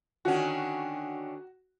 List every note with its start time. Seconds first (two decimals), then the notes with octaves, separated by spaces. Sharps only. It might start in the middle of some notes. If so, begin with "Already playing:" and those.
0.25 D3 D#3 C#4 F#4